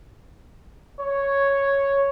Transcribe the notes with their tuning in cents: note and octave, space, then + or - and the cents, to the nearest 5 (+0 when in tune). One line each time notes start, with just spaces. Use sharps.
C#5 +0